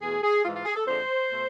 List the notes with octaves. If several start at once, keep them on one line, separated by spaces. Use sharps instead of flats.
E2 B2 A3 G#4
G#4
G#2 E3 G#3 F4
F4
G#4
A4
F2 D3 G#3 C5
B2 A3